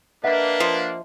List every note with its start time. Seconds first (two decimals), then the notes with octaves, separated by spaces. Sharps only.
0.24 A#3 D4 B4 D#5 E5 F#5
0.60 F3